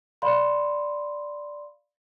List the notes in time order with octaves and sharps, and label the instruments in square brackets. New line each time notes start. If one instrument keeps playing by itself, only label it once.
[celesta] D5 F5 B5 C6